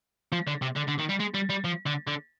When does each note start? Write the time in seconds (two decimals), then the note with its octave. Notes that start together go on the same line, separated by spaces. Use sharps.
0.32 F3
0.47 D3
0.62 C3
0.76 D3
0.87 D3
0.98 D#3
1.09 G3
1.20 G#3
1.34 G3
1.50 G3
1.64 F3
1.86 D3
2.07 D3